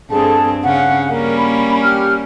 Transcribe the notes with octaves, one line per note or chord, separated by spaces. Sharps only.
G2 C4 G#4 A4 A5
C#3 C#4 F5 F#5
G3 A#3 C#4 A#4
B5
G4 F6